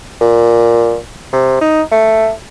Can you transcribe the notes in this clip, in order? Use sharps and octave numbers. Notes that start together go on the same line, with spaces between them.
A#2
C3
D#4
A3